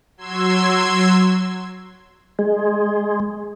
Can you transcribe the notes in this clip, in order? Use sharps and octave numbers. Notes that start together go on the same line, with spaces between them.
F#3 C6 E6 G#6
G#3